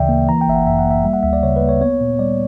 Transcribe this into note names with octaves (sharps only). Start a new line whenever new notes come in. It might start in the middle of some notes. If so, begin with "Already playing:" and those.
Already playing: D2 C#3 E3 D5 E5 G5
A#3
E3 A#5
G5
G1 E5
F#5
F#2 E5
F#5
A#3
E5
G3
F#5
D2 E5
D5
C#3 C#5
B4
A#3
C#5
B3 C#5
A#2
G3 D5